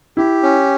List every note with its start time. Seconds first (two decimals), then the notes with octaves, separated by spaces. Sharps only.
0.17 E4 G4
0.43 C#4